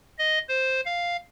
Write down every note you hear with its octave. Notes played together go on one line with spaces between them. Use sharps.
D#5
C5
F5